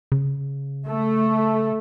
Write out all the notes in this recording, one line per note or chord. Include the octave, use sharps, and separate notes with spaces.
C#3
A3